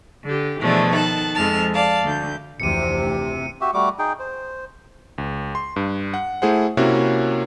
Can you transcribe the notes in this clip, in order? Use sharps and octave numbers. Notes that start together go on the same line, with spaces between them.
D3 G4
B2 E3 F3 A3 D4 G#4
D#3 A4 A5 F#6
F2 F3 G#3 E5 A5 F6
D5 F5 A5
D2 G6
F1 D2 C3 E3 C#7 D#7
F#4 G4 E5
G3 A3 F#4 D6
D#4 G#4 G5
C5
C#2
C6
G2
F#5
A3 E4 G#4 C5 F#5
C3 A#3 C#4 E4 F#4